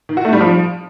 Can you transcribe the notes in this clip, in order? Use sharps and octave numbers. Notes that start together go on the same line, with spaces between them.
D#3
F#4
A3
G3
F3